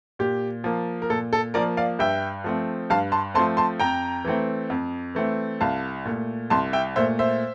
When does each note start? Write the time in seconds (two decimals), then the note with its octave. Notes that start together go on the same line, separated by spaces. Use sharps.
0.19 A#2 G4
0.64 F3 A#3
1.02 A#4
1.10 A#2 A4
1.33 A4
1.54 F3 A#3 A#4 D5
1.77 D5 F5
1.99 G2 E5 G5
2.44 F3 A3 C4
2.90 G2 F5 A5
3.12 A5 C6
3.34 F3 A3 C4 A5 C6
3.57 A5 C6
3.80 F2 G5 A#5
4.25 E3 A3 C4
4.70 F2
5.15 E3 A3 C4
5.61 C2 F5 A5
6.05 A#2 A3
6.50 C2 A5 C6
6.73 E5 G5
6.96 A#2 A3 C5 E5
7.19 C5 E5